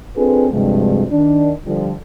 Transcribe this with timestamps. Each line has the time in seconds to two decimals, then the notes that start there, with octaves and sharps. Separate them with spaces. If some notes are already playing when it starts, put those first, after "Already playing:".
0.16 C4 D4 F4 G#4 A4 B4
0.51 D2 G2 C3 F3 G#3
1.11 D#3 D4
1.66 D3 F3 G3